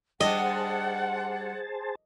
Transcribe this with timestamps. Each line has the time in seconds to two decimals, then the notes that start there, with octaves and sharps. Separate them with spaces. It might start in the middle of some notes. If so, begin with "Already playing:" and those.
0.20 G3 D4 G#4 C5 D#5 F#5 A5